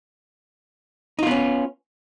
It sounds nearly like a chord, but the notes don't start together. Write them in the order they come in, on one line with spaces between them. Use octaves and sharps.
D#4 F4 B3 C#4